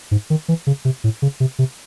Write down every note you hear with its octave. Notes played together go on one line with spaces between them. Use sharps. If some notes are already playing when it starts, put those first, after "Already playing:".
G#2
D#3
E3
C#3
C3
A2
C#3
C3
C3